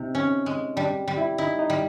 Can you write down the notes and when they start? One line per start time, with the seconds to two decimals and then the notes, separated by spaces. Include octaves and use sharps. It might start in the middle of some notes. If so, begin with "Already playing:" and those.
Already playing: C3 D#4
0.15 C#4
0.46 G#3
0.76 G3 D4
1.08 G3
1.18 E4
1.38 D#4 E4
1.59 D#4
1.70 G3